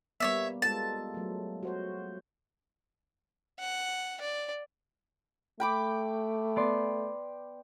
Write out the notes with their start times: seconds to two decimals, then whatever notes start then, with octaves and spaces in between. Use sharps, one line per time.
0.20 G3 A#3 B3 C#5 D5 E5
0.62 G#3 F4 A4 A5
1.14 F#3 A3
1.63 F#4 C5 C#5
3.59 F#5
4.21 D5
5.60 A3 G5 B5 D6
6.56 B3 D5 C6